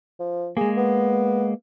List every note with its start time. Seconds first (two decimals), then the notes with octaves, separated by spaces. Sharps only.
0.20 F3
0.57 G#3 A#3 G#4
0.77 B3